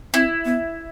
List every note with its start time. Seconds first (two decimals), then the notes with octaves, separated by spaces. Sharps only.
0.14 C4 E4
0.45 B3